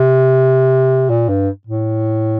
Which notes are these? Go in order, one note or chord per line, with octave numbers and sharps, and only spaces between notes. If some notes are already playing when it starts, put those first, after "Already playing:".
Already playing: C3
A#2
G2
A2